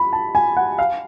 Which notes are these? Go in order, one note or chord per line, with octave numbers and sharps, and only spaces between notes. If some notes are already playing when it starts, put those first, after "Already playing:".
Already playing: B5
A5
G#5
F#5
F5